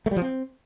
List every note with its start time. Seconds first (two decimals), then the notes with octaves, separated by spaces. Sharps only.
0.06 A3
0.11 G3
0.16 F3
0.22 C4